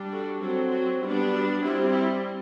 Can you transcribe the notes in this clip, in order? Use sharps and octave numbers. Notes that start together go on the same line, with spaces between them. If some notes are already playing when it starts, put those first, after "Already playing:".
Already playing: G3 D4
F#4 A4
F#3 C4 F#4 A4
F#4
G3 B3 D4 E4
F#4
G3 C4 E4
E4